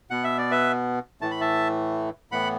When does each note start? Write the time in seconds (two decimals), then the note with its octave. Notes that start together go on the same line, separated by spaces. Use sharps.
0.10 B2 B3 F#5
0.24 E5
0.38 D5
0.51 B4 E5
1.21 A2 E3 A3 A5
1.31 B5
1.41 E5 A5
2.31 A2 E3 B3 F#5 B5